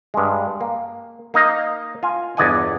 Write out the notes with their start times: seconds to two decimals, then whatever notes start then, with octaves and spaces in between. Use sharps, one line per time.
0.14 G2 G#3
0.61 A#3
1.34 A#3 D#4 D#5
2.03 F4 G#5
2.37 G1 E2 D5 D#5 F#5 G#5